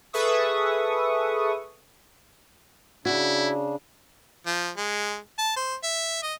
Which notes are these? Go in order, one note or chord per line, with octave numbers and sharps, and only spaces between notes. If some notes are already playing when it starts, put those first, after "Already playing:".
G#4 A4 B4 E5 C#6 D#6
C#3 D4 E4 F#4
F3
G#3
A5
C5
E5
D#5